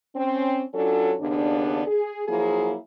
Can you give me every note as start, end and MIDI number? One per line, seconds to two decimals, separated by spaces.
0.15 0.62 60
0.15 0.62 61
0.74 1.13 54
0.74 1.13 61
0.74 1.13 62
0.74 1.13 65
0.74 1.13 69
1.20 1.82 39
1.20 1.82 49
1.20 1.82 59
1.20 1.82 62
1.87 2.22 68
2.28 2.74 53
2.28 2.74 54
2.28 2.74 58
2.28 2.74 64
2.28 2.74 68